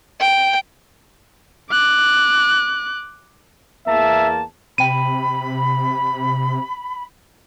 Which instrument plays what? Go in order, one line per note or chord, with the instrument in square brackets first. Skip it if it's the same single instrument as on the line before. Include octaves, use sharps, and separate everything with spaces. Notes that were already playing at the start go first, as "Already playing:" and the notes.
[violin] G5
[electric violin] D6 F#6
[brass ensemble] E2 A#3 A5 [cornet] E5
[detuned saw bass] C3 [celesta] G5 D#7 [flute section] B5